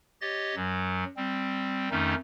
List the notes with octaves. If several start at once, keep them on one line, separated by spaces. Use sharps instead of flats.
G4 C#5 D#5 A6
F#2 F#3
G3 C4
F2 D#3 A3 C#4 D#4